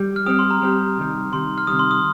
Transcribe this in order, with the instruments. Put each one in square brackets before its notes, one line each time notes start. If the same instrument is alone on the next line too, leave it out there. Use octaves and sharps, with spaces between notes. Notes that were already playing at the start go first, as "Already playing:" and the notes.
Already playing: [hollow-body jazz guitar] G3
[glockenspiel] F6
[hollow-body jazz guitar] G3 C4 G4 [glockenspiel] D#6
[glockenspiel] C6
A#5
[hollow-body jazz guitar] G3 C4 G4
C3 D#3 G3
[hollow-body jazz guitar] C3 D#3 G3 [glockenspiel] C6
[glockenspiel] F6
[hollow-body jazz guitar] C3 D#3 G3 [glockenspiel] D#6
[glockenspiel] C6
D#6